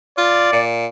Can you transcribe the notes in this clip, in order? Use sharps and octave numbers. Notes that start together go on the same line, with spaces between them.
F4 D5
A#2